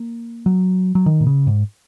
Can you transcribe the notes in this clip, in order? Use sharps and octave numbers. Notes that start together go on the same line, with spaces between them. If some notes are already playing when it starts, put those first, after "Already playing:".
Already playing: A#3
F#3
F#3
D#3
A#2
C#3
G#2